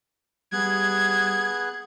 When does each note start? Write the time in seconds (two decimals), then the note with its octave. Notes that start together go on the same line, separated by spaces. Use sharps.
0.53 G3 B3 G#4 F#6 G#6